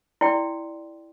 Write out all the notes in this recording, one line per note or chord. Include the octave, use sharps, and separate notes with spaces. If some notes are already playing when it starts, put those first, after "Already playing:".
E4 A4 D5 G5 C6